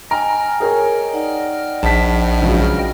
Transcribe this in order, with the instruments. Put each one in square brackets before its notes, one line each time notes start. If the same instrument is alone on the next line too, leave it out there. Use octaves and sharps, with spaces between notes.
[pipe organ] D#5 G5 F6 [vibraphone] G#5 [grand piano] A#5
[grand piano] G#4 A#4 C#5
[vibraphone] D#4 D5 F#5
[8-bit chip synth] A#1 [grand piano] A5 B6
[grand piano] C#2 C#3 F#3